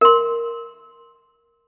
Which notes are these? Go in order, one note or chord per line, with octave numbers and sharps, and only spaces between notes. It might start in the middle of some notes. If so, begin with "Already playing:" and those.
A#4 C6